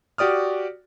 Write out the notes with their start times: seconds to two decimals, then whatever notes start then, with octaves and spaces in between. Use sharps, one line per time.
0.18 F#4 G4 D5 D#6 F6